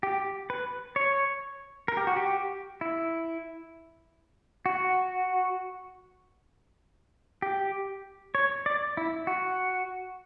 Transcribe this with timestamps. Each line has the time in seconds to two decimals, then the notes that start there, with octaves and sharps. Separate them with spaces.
0.03 G4
0.50 B4
0.96 C#5
1.88 A#4
1.97 G4
2.07 F#4
2.17 G4
2.81 E4
4.66 F#4
7.42 G4
8.35 C#5
8.66 D5
8.97 E4
9.27 F#4